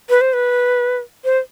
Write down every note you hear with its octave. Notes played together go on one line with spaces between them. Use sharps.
B4
C5
B4
C5